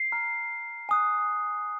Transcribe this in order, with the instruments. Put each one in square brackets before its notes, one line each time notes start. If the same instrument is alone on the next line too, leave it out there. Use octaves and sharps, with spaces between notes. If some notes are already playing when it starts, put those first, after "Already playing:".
Already playing: [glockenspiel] C7
A#5 F6
G#5 D#6 F#6